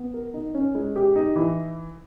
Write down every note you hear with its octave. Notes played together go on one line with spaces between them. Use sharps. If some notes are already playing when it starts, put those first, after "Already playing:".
Already playing: B3
A#4
D#4
C#4
G#3
G4
D#4
E3